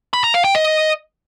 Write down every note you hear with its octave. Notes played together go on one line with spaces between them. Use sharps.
B5
A#5
F5
G5
D#5